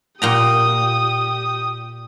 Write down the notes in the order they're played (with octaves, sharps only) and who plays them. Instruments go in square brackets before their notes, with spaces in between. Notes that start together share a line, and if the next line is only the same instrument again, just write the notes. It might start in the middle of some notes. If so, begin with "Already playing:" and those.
[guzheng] A#2 G5 A#5 [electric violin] G4 D#6